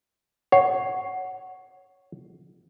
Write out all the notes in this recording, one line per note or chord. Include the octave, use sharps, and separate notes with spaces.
C#5 F#5